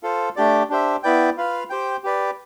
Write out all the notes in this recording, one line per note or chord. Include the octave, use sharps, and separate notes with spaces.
F4 A4 C5
A3 D4 G4 D5
D4 G4 C5 E5
B3 E4 B4 D5 G5
F4 B4 F5
G4 C5 G5
G4 B4 D5